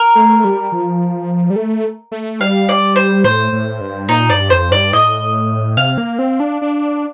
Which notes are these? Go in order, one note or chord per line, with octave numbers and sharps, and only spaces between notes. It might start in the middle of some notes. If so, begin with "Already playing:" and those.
Already playing: A#4
A3
G3
F3
G3
A3
A3
G3 F5
D5
C5
A2 C5
A2
G2
A#2 D#4
G2 D5
F2 C5
G2 D5
A2 D#5
C3 F5
A#3
C4
D4
D4